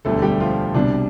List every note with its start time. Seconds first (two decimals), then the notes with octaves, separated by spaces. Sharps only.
0.05 E1 D2 D3 G3 A3 A4
0.22 G3 G4
0.40 F3 F4
0.74 C2 B2 G3 D4